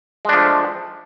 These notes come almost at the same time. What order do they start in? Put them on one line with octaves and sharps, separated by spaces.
G#3 D4 F3 A3